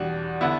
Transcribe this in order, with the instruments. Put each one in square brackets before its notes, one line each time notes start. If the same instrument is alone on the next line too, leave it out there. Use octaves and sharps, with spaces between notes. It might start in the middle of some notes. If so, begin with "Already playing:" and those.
Already playing: [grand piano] E2 B2 G3 D4
D3 B3 E4